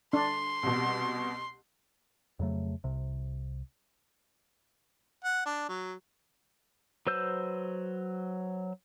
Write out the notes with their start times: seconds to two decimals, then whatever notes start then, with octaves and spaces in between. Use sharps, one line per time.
0.13 D4 C6
0.63 C2 B2
2.39 F2 C#3 F#3 A3
2.84 C2 C3
5.24 F#5
5.46 D4
5.69 F#3
7.07 F#3 B4 C5 E6 G6